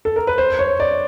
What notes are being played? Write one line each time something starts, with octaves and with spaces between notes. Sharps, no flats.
A4
A#4
B4
C5
C#5
D5